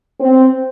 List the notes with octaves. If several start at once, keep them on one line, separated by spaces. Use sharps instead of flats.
C4